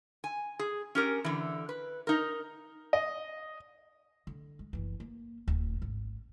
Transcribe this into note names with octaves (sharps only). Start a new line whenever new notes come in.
G#5
G#4
C#4 G4 A#4
D3 E3
B4
D#4 A#4
D#5
D3
G#3
F#1 E3
A#3
D1 D2
G#1